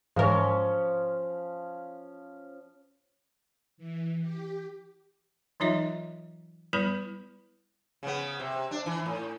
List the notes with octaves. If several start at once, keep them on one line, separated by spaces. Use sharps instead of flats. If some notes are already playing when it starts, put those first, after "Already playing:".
G#2 E3 F3 C#4 A#4
E3
G4
E3 F#3 D#4 F4 D#5 E5
G3 B3 E4 B4 B5
C#3 B3
C3
D4
E3
A2